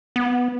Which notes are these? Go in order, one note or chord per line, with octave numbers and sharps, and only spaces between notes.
B3